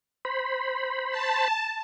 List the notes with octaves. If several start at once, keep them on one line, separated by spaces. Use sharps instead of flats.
C5 B5
A5